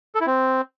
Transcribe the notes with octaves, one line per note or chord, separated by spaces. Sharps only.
A4
E4
C4